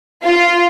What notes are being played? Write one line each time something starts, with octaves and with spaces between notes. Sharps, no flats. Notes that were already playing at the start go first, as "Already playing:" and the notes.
F4